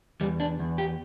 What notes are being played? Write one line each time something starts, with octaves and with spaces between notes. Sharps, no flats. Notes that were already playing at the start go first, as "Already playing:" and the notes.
E2 G3
D4
E2
G4